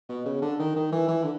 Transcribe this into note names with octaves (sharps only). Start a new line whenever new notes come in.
B2
C#3
D3
D#3
D#3
E3
E3
D3